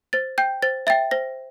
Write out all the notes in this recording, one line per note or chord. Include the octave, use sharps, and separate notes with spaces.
C5 A6
G5 G6
C5 A6
E5 G5 A6
C5 A#6